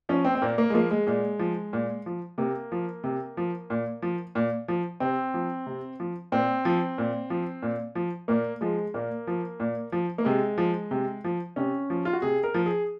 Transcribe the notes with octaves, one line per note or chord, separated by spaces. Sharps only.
F3 C#4
C4
C4
A#2 A#3
A#3
G#3
F3 A#3
G#3
A#2 G#3
F3
A#2
F3
C3 A#3
F3
C3
F3
A#2
F3
A#2
F3
C3 C4
F3
C3
F3
A#2 C4
F3
A#2
F3
A#2
F3
A#2 A#3
F3 G#3
A#2 A#3
F3
A#2
F3
A#3
C3 G#3
F3
C3
F3
C3 C#4
F3
F4
F#4
C3 G#4
A#4
F3
G#4